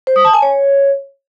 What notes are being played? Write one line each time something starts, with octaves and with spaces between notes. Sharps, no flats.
C5
D#6
A5
G#5
C#5